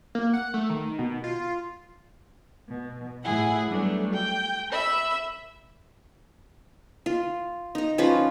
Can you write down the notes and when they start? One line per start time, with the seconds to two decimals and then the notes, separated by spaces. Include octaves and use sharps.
0.15 A#3
0.33 F#5
0.54 A3
0.70 D#3
0.99 B2
1.24 F4
2.68 B2
3.23 A2 E4 G#4 F#5
3.70 F#3 G3 A3 B3 D4
4.14 G5
4.72 E5 B5 E6
7.06 F4
7.75 D#4 A#5
7.98 F3 C#4 F4 B4